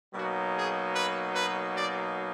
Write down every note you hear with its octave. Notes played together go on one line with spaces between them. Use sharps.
B2 F#3 A#3 D#4 F#4
G#4
B4
B4
D5